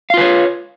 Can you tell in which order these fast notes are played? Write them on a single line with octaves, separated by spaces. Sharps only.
F5 F4 B4 C#5